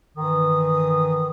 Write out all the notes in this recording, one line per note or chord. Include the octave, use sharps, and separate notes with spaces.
G2 D#3 E3 D#6